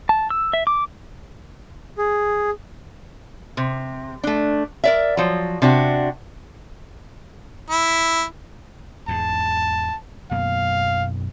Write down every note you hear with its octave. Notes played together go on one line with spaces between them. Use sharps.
A5
E6
E5
D6
G#4
C3
A3 D4
A#4 D5 E5
F3 F#3
C3 D4 F#4
E4
E2 G#2 A5
F#2 B2 A#3 F5